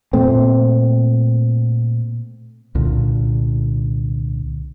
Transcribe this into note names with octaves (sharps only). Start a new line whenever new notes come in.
A#2 A3 C4
C2 A#2 D3